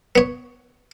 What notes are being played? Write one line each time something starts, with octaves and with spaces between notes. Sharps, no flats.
B3 C#5